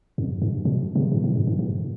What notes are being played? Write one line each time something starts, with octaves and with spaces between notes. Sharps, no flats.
F2
G2
A#2
C3
G#2
G#2
G2
G2
G#2